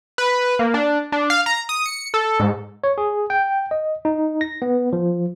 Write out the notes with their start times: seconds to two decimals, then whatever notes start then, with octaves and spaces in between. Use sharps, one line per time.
0.18 B4
0.59 A#3
0.74 D4
1.12 D4
1.30 F5
1.46 A#5
1.69 D#6
1.86 C#7
2.14 A4
2.40 G#2
2.84 C#5
2.98 G#4
3.30 G5
3.71 D#5
4.05 D#4
4.41 A#6
4.62 B3
4.93 F3